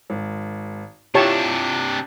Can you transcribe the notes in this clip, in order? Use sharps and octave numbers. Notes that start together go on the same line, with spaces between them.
G#1
C3 D4 E4 F4 G4 C#5 A5